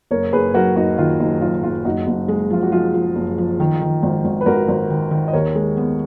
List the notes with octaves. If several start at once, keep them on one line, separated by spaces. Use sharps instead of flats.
F#1 A#4 C#5
F#1 G#4 B4
F#2 F#4 A#4
F#1 D#4 F#4
D#3 F4
F#1 D#4
F#2 F4
F#1 F4
F#1 D#4 F#4
F#1
G#3
F3 F4
F#4
F3 F4 G#4
F3
F#1
F3
D#3
D#3
G#1
G#1
B4
G#1 F#4 A#4
G#1
D#3
D#3
D#5
D#2 A#4 C#5
G#3
B3